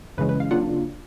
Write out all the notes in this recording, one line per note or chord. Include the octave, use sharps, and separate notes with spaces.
F#2 C#3 E3 G#3 C#4 B4
B4
F5
C#3 F#3 A#3 D4 F4 F#5